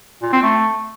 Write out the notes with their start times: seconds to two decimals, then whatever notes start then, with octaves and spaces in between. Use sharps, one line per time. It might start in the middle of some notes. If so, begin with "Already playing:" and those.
0.22 A#2
0.33 C4
0.43 A3